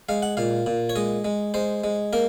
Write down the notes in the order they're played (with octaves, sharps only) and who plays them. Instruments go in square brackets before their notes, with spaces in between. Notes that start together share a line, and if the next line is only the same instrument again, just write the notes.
[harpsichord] G#3 F5
F#5
A#2 F5
A#2
C#5
G#3 D#5
G#3
G#3 C5
G#3
A#3 A#4